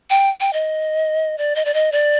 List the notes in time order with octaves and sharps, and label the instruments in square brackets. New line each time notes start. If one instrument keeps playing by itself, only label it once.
[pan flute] G5
G5
D#5
D5
D#5
D5
D#5
D5